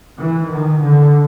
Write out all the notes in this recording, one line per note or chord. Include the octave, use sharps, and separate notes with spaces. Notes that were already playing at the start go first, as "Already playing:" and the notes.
E3
D#3
D3